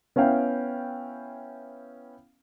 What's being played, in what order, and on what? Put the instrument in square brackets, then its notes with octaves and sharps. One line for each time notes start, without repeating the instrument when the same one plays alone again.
[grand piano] B3 C#4 E4 F5 G5